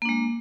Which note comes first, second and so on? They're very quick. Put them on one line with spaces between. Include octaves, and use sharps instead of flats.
A#3 D4 G#3